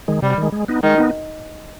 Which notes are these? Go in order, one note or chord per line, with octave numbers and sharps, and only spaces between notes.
D#3 G#3
C3 G3
D#3 G#3
G#3
B3 D#4
D#3 G#3
B3 D#4